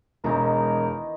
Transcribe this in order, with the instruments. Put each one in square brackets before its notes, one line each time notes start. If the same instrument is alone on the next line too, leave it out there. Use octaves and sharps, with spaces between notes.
[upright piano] E1 [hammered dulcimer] D#3 E3 D#4 [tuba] G#3 [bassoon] A#4